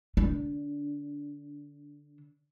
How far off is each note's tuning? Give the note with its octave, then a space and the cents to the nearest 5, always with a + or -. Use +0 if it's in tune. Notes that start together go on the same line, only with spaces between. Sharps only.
D3 -5 D4 -25